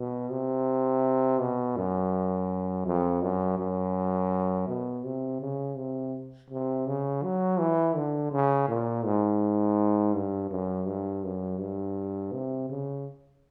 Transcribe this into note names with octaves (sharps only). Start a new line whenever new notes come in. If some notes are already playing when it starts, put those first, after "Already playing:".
Already playing: B2
C3
B2
F#2
F2
F#2
F#2
B2
C3
C#3
C3
C3
C#3
F#3
E3
D3
C#3
A#2
G#2
G2
F#2
G2
F#2
G2
C3
C#3